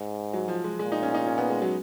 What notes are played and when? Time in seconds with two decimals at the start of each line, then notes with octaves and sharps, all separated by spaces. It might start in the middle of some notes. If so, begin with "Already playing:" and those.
Already playing: G#2
0.34 F#3
0.48 F3
0.64 G#3
0.79 A#2 G#3
0.92 D#4
1.03 C#4
1.14 D#4
1.26 C#4
1.38 B3
1.50 G#3
1.62 F#3